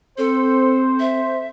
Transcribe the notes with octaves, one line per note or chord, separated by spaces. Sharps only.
C4 A4 C5
E5